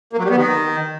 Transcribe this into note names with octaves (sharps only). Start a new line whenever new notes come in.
A#3
F#3
G3
B3
D#3